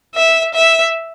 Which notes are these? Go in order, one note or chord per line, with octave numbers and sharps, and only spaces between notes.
E5
E5